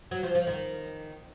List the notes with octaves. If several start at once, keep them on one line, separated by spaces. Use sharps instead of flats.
F#3
F3
F3
D#3